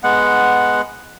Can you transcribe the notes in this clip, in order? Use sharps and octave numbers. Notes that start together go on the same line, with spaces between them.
G#3 B3 F#5